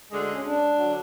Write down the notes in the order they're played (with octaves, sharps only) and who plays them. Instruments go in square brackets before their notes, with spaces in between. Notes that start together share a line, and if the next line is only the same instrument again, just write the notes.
[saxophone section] D2 D3 G#3
[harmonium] C#4
D4
[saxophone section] D3 F#3